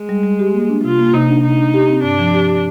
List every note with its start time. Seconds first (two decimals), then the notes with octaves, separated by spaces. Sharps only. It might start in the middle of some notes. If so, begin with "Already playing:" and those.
Already playing: G#3
0.09 G3
0.23 G3
0.39 G4
0.54 A#3
0.69 D4
0.84 C3 F4
0.99 A#3
1.13 C3 D#4
1.29 D4
1.44 C3 D#4
1.59 D4
1.74 G4
1.89 C4
2.03 G2 D4
2.19 F3
2.34 G4
2.49 G4